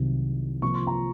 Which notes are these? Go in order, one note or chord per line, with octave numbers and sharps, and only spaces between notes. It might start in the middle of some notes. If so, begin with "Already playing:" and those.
Already playing: C2 C3 D#3 F#3
C3 F3 A#3 F4 C#6
C6
A#5